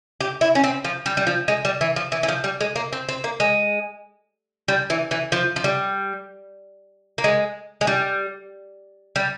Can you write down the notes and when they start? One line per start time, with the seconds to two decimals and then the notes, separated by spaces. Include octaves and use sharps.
0.20 G4
0.41 E4
0.55 C#4
0.64 C4
0.84 F3
1.06 G3
1.17 G3
1.27 F3
1.48 G#3
1.65 G3
1.81 E3
1.96 F3
2.12 E3
2.23 E3
2.28 F3
2.44 G3
2.60 G#3
2.76 A#3
2.93 C4
3.09 C4
3.24 A#3
3.40 G#3
4.68 G3
4.90 E3
5.11 E3
5.32 F3
5.56 F3
5.64 G3
7.18 A#3
7.24 G#3
7.81 G#3
7.87 G3
9.16 G3